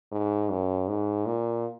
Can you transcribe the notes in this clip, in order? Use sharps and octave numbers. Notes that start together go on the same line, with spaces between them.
G#2
F#2
G#2
A#2